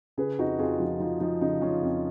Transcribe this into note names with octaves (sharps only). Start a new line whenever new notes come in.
C#3 G#4 B4
F2 D#4 F#4
F2 F4 G#4
F3 D#4 F#4
F3 D#4
F3 D#4
C#3 D#4
F3 C#4 F4
F2